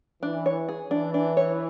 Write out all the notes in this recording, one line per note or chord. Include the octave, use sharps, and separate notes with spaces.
E3 D4
C#5
G#4
E3 D4
D4
C#5